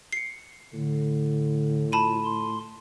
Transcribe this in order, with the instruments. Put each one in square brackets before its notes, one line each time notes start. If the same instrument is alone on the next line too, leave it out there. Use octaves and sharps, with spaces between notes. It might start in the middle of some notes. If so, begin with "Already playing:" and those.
[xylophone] C7 C#7
[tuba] A2 [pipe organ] D3
[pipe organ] F4 [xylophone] A5 B5 D#7
[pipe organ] C6